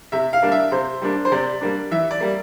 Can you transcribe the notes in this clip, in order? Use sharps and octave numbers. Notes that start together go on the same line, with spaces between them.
C3 E5
F5
G3 A#3 D4
E5
C3 C5
G3 A#3 D4
C5
C3 D5
G3 A#3 D4
E3 E5
D5
G3 A#3